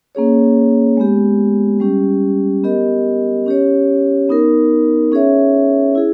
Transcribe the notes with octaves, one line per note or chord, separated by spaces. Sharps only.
A#3 C#4 G#4 C#5
G#3 B3 G4
G3 C#4 G4
B3 G4 A#4 D#5
C#4 G4 C#5
B3 D#4 A#4
C#4 G#4 C#5 E5
E4 G#4